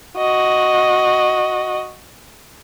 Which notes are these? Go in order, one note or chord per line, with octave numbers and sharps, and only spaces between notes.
F#4 D#5